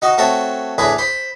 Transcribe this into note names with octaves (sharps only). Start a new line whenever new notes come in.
D#4 F#4 D#5
A3 C4 F#4 C#5 A5
E2 A2 D4 G#4 B4 B5
C5 B5